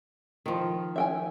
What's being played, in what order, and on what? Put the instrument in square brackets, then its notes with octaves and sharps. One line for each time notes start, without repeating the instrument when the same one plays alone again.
[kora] D#3 F3
[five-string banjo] E5 G5 G#5